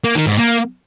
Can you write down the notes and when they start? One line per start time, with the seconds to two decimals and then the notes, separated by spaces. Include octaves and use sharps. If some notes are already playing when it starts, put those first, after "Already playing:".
0.04 A#3
0.16 D#3
0.27 G#2
0.38 A#3